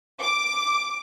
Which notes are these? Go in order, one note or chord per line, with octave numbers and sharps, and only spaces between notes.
D6